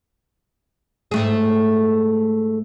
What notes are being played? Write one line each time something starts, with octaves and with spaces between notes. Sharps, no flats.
G#2 A3 G#4